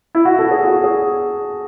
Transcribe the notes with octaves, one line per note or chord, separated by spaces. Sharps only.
E4
F#4
A4
G#4
F#4
G#4